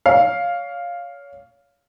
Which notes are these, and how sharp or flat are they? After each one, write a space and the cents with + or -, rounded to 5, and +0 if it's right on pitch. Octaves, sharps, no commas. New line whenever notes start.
C#5 +30 F5 +0